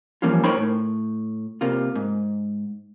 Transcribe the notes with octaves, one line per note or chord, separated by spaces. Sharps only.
E3 F3 G3 A#3 C#4 F4
D#4 A#4 C5 C#5 G5 B5
A2
C3 A#3 F4
G#2